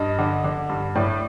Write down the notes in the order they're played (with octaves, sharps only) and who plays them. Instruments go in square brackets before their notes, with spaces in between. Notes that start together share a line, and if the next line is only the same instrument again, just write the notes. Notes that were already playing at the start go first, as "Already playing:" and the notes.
Already playing: [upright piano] G2 D#5
D3
D3
G2
A2 D5